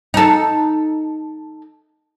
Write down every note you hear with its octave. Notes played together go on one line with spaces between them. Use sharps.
D#4 A4